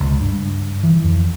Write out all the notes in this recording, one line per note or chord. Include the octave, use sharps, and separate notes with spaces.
C#2
G2
E3
F2